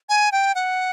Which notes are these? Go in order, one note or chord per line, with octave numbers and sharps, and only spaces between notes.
G#5
G5
F#5